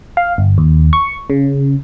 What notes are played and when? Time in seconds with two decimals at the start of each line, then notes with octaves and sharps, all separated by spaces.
0.17 F5
0.38 G1
0.58 D#2
0.93 C#6
1.30 C#3